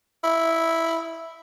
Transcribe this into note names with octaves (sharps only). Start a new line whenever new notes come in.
E4